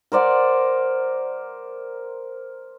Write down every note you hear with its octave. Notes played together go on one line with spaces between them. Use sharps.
A#4 C5 D5 F#5